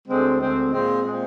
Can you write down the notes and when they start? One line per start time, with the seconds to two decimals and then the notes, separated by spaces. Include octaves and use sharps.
0.07 D2 D3 G#3 C4
0.39 D2 D3 G#3 C4
0.72 A#2 G#3 C4
1.03 A#2 G#3 C4